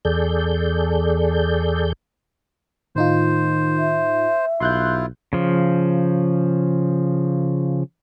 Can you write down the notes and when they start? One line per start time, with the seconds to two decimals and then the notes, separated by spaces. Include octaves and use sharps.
0.05 E2 G#4 A4 D5 G6
2.96 A2 D#3 D#4 F4 C5
3.78 E5
4.60 B1 E4 F4 C6 F#6 G6
5.33 C#3 F3